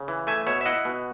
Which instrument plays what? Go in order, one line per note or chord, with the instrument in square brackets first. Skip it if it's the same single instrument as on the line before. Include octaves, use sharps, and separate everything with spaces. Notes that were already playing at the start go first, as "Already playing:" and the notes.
Already playing: [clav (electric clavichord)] C#3
E3
A3 E5 G#5
B2 C#5 E5
E5
E4 D#5 F#5
B2